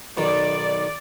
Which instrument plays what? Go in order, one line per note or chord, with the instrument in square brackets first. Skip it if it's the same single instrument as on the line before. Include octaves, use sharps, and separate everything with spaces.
[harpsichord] B1 D#3 [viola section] D5